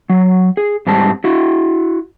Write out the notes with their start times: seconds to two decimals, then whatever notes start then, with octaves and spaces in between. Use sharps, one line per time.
0.10 F#3
0.57 G#4
0.87 G#2 G3 C4 A5
1.24 E4 F#4